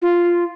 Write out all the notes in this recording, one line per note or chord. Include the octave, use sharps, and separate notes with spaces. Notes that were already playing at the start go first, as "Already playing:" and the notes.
F4